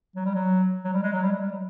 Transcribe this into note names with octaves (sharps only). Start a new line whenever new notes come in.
F#3
G3
F#3
F#3
G3
G#3
F#3
G3
G#3
G3
F#3